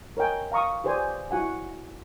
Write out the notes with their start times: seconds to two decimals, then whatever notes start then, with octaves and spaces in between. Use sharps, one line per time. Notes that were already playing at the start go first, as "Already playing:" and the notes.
0.17 A#4 C#5 D#5 G5 G#5
0.52 F5 A#5 C#6 D#6
0.84 G4 G#4 B4 C5 D5 G#5
1.31 E4 F#4 F#5 G#5